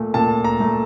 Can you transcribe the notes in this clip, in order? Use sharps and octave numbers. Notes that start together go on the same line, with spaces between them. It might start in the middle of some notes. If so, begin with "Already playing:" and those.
Already playing: A#2 A3
A#2 A5
A#5
A3